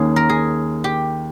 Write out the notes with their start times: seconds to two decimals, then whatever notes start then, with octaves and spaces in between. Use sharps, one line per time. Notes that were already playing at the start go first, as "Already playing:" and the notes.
Already playing: D#2 D#3 A#3 C#4 G#4
0.16 A#4
0.29 G#4
0.84 G4